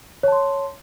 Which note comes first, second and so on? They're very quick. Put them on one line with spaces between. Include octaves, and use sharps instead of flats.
C#5 A5 C6